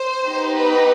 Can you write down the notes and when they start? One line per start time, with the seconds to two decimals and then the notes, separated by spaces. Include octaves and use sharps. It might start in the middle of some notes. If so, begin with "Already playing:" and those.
Already playing: C5
0.25 B3 D#4 G4
0.56 B4